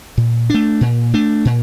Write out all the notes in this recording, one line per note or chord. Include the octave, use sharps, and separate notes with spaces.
A#2
A3 D4
A#2
A3 D4
A#2